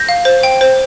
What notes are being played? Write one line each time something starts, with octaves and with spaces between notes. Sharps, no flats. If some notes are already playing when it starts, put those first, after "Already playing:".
Already playing: G6 A#6
F5
C5
G5
C5